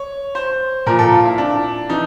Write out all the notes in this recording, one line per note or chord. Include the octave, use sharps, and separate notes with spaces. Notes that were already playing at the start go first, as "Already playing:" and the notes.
Already playing: C#5
C5
A#2 F3 A#4
A4
F4
E4
D4
E3 D#4